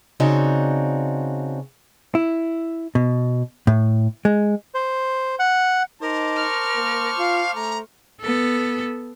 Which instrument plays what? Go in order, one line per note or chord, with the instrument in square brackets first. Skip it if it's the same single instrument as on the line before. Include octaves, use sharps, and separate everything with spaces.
[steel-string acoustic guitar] C#3 C4 D4 D#4 F#4
[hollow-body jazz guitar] E4
B2
A2
G#3
[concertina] C5
F#5
[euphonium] D#4 [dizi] A#4 [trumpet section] C5 A5 D6
[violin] C#6 F6
[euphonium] A#3
[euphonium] F4 [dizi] F5
[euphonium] A3 [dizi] A#5
[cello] B3 A4